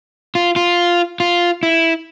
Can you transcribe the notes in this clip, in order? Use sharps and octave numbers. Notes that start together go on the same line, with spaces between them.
F4
F4
F4
E4